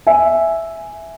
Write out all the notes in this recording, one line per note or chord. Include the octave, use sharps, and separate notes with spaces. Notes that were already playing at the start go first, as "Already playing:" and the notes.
E5 G#5